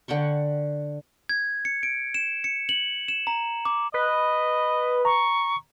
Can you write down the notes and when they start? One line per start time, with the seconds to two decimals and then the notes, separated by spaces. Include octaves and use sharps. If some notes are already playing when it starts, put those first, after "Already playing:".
0.08 D3 F#5 G5 C#6
1.29 G#6
1.65 C#7
1.83 D7
2.14 E7
2.44 C#7
2.69 F#7
3.08 E7
3.27 A#5
3.65 D6
3.94 B4 D#5
5.05 A#5 C#6